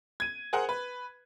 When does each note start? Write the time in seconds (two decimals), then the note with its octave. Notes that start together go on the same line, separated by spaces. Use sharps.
0.20 G#6 D#7
0.53 G#4 A#4 C5 F#5
0.69 B4